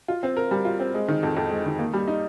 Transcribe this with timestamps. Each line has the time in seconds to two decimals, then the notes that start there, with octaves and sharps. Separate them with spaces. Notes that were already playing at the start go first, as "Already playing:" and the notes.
0.08 F4
0.23 C4
0.37 A#4
0.51 G3
0.65 F4
0.80 C4
0.94 G#3
1.08 D#3
1.23 F2
1.37 F2
1.51 G#3
1.66 D#3
1.79 A#3
1.93 G3
2.08 D#4